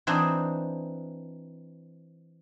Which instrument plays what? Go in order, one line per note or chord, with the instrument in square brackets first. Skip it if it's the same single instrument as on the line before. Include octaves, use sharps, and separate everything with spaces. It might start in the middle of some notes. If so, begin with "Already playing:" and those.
[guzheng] E3 C4 D4 D#4